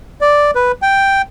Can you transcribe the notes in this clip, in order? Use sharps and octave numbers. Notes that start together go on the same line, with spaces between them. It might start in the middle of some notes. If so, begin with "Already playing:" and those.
D5
B4
G5